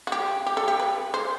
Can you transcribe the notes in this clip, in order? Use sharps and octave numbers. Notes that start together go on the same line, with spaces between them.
F#4
G4
G4
A4
G4
B4
C5